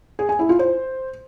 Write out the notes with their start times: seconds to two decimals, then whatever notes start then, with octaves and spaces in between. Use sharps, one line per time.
0.19 G#4
0.29 G#5
0.39 E4
0.49 F4
0.59 C5